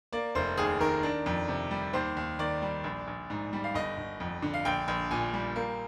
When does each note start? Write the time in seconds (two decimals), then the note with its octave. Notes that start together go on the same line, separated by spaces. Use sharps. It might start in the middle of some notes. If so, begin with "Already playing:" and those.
0.13 A#3 D5
0.35 F1 C5
0.57 D#2 G#4
0.80 D#3 A#4
1.03 D4
1.26 F2
1.48 C3
1.71 G3
1.93 D#2 C5
2.17 D#2
2.39 D#3 D5
2.62 G3
2.84 A#1
3.07 A#1
3.30 G#2
3.53 G3
3.64 F5
3.74 G1 D#5
3.97 G1
4.20 F2
4.42 D3
4.54 F5
4.65 A#1 G5
4.88 A#1
5.11 A#2 G#5
5.33 G3
5.56 A#3